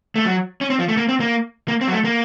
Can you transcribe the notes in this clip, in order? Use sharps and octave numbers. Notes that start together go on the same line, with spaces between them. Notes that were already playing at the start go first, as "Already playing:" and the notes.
A3
F#3
C#4
C4
F3
A3
A#3
C4
A#3
A#3
C4
F#3
A3
A#3